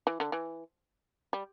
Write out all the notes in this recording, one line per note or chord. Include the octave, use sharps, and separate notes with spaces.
E3
D3
E3
G3